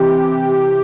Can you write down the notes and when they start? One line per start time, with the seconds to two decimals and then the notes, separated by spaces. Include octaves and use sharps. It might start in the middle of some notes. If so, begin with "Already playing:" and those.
Already playing: C3 E3 G4